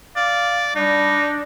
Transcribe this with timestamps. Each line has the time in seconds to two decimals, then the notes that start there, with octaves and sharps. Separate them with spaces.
0.16 D5 F5
0.76 G3 D4 D#4